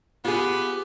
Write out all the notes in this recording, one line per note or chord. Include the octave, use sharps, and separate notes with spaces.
B3 F4 G4 G#4